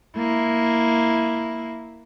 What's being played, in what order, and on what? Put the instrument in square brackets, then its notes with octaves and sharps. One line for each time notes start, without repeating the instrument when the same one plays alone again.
[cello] A#3 E4